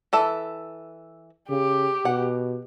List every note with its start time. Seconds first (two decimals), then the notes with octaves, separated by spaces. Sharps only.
0.13 E3 A4 E5
1.49 C#3 G4
2.05 B2 F#5